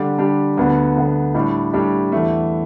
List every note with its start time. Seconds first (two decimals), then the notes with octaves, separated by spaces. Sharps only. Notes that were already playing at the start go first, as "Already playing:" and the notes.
Already playing: D3 G3 D4 G4
0.18 D3 G3 D4 G4
0.57 D2 D3 B3
0.96 D2 D3 B3
1.35 A2 G3 D4 G4
1.73 A2 G3 D4 G4
2.12 E2 E3 A3